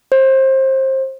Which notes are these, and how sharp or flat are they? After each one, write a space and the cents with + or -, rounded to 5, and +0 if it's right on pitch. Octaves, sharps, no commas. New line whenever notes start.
C5 +25